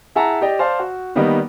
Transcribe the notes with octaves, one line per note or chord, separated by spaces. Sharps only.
E4 G#4 E5 F#5 A5 A#5
G4 D5 D#5 G5
C5 D5 F5 A5
F#4
D#3 G3 A#3 B3 D#4